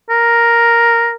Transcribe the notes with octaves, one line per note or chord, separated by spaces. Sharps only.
A#4